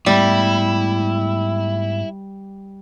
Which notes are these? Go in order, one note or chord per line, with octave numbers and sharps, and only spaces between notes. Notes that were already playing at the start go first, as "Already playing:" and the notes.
G#2 G3 A3 B3 E4